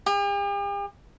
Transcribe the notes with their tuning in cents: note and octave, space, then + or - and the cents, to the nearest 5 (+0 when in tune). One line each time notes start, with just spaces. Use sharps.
G4 +45